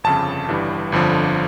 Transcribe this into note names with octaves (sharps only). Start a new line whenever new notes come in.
G1 F2 C#3 A5
G1 G2 E3 G3
G1 F2 D3 F3